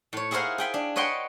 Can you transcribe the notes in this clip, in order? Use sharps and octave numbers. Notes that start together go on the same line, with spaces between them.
A2 C#5
E4 G#4 A#4 C5 F5 F#5
G#4 G5 B5
D4
B4 C#5 D#5 F#5 G5 C6